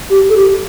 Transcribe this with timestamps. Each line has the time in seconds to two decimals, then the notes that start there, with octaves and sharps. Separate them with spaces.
0.10 G4
0.29 A4
0.36 G4